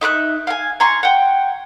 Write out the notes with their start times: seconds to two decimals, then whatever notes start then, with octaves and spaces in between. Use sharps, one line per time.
0.01 D#4 E5 D6 F#6
0.47 F5 G5 G#5
0.80 G#5 A#5 C6 C#6
1.03 F#5 G5